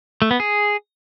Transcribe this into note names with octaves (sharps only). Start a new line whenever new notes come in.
A3
B3
G#4